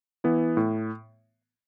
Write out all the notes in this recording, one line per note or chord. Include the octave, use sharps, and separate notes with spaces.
E3 B3 E4
A2